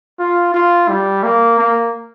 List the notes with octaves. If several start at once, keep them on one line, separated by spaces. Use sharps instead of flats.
F4
F4
G3
A#3
A#3